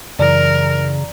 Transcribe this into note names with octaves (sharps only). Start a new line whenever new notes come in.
F#2 C#3 E3 A#4 D5 A#5